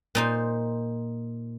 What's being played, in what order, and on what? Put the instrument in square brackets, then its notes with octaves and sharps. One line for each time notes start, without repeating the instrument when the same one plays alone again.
[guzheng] A#2 D#4 C5